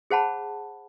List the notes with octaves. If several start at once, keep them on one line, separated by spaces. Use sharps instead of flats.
G#4 C5 F#5 A5 B5